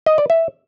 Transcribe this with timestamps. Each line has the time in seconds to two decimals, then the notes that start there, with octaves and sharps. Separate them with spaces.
0.06 D#5
0.18 D5
0.30 E5